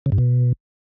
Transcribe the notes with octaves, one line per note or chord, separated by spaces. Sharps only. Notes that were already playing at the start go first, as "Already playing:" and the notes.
C#3
G2
B2